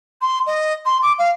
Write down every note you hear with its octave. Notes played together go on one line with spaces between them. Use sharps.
C6
D#5
C6
D6
F5